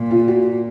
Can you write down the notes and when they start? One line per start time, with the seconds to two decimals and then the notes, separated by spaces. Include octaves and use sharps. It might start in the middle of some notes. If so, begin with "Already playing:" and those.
Already playing: A#2
0.11 F4
0.28 F#4